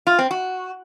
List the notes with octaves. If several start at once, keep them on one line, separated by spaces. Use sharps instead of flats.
F4
C4
F#4